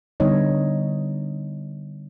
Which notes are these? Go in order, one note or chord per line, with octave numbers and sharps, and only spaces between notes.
D3 G3 B3 D#4 C#5 D#5